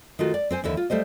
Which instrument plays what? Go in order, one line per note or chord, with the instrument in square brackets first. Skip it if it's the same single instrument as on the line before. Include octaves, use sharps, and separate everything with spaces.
[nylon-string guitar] D#3 A3 F4 F#4
D5
C4 C5 G#5
D#2 D3 E3 E5
F4
G3 A3 C5 D#5